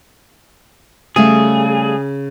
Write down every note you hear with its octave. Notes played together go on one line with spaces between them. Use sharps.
C#3 G3 A3 G#4 F5